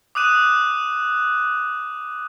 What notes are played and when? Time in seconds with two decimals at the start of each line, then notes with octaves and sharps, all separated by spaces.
0.15 D6 D#6 F#6 D#7 E7